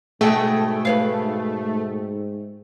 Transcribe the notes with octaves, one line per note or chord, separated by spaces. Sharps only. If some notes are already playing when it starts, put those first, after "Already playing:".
G#2 B2 A3 G#4 G5
B4 C#5 F5